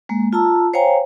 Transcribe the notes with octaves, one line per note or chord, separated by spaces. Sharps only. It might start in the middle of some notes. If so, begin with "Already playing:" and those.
G#3 A#3
F4 A5 A#5 E6
C5 C#5 F5 G5 G#5 A#5